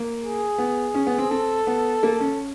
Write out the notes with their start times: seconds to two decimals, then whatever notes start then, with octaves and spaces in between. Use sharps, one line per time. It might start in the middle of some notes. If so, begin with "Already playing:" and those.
Already playing: A#3
0.23 G#4
0.58 B3
0.95 C#4
1.07 B3
1.18 C4
1.30 C4 A4
1.67 B3
2.03 A#3
2.20 C#4